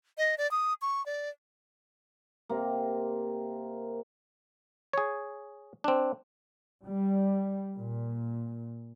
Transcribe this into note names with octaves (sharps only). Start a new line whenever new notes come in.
D#5
D5
D#6
C#6
D5
C3 A#3
G#4 C#5
C4 D4
G3
A#2